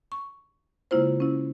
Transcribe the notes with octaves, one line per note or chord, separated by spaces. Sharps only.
C#6
C#3 G#3 A#3 E4 F4 C5
C#4 E4